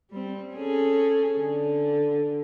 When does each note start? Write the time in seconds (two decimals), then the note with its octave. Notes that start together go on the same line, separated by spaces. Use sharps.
0.11 G3 C4
0.55 C#4 G#4 A4
1.39 D3